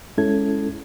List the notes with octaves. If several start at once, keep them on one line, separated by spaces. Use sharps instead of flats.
G#3 C#4 E4 A4 G#6